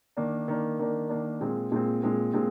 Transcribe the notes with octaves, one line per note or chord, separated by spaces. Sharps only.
D#3 A#3 D4
D#3 A#3 D4
D#3 A#3 D4
D#3 A#3 D4
A#2 G#3 C4
A#2 G#3 C4
A#2 G#3 C4
A#2 G#3 C4